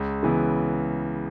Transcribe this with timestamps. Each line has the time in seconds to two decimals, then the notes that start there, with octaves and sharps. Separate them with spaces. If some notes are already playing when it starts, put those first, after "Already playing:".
Already playing: C#2
0.23 C#3 E3 B3